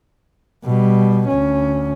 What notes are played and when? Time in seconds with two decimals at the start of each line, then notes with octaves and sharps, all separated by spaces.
0.65 B2 G3
1.28 D2 C#4